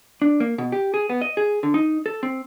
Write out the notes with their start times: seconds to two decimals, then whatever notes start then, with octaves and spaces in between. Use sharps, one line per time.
0.22 D4
0.40 A#3
0.58 B2
0.72 G4
0.94 G#4
1.09 B3
1.21 D#5
1.37 G#4
1.63 D3
1.74 D#4
2.06 A4
2.23 C4